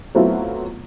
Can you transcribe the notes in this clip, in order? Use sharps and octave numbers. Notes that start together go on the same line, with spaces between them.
F#3 A3 B3 C4 E4 F4